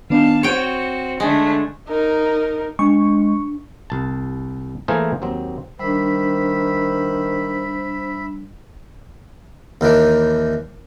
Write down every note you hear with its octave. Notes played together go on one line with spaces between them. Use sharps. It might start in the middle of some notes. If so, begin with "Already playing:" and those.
D#3 B3 D4 F5 A5
C4 F#4 C#5 G5 C#7
D3 G#3 A3 D4
D#4 A#4
G#3 D4 C#6
C2 A5
E3 A3 A#3 G#4 A#4 C5
D#2 F#3 C4
D#3 G3 D4 C5 E5 B5
D#2 D#3 E3 D4